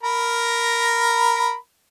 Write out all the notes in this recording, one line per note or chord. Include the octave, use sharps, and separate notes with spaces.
A#4 A#5 B5